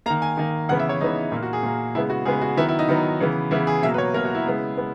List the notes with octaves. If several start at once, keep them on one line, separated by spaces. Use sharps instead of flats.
D#3 A#3 A#5
G#5
D#3 A#3
C#3 E3 B3 F#5
E5
C#5
C#3 E3 B3 D#4
A#2 A#3 E4
F#4
G#4
A#2 A#3
C#3 G#3 B3 E4
F#4
C#3 G#3 B3 G#4
F#4
D#3 F#3 B3 E4
E4
D#4
D#3 F#3 B3
C#3 E3 B3
C#3 E3 B3 E4
G#4
B2 F#3 A#3 E5
B4
C#5
B2 F#3 A#3 A#4
F#4
E4
C#3 G#3 B3
G#3 B3